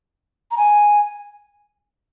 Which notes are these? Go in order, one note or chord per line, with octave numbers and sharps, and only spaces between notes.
A#5
G#5